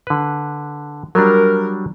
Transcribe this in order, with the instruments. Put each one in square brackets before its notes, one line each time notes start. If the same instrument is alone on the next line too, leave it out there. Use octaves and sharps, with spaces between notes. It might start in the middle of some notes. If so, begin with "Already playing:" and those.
[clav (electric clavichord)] D3 B4
[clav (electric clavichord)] F#3 G3 D4 [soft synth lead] A#4